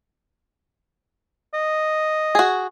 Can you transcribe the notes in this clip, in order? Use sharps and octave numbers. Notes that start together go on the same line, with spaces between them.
D#5
F#4 G#4